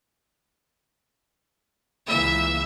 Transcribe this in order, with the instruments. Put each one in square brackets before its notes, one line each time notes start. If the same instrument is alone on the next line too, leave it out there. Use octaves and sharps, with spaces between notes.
[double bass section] C#2 E3 A#3 [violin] E5